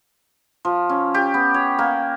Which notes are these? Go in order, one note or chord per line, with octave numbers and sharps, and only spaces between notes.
F3
C#4
G4
B3
C#5
A#3